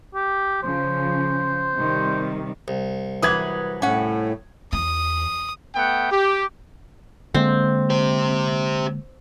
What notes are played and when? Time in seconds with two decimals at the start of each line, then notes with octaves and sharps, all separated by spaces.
0.15 G4
0.63 C#3 F3 C5
1.76 C3 D#3 G3
2.68 C2
3.22 E3 F#3 B4 D#6 G#6
3.82 A2 C#4 F#5
4.73 E2 D#6
5.75 A3 B3 F#5 G5
6.11 G4
7.34 D3 G#3 A#3 C4
7.90 G4 C5